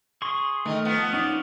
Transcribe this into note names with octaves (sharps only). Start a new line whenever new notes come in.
G#4 C6 C#6
D#3 A3 A#4 D#5
F3 B3
C#4 D#4 D5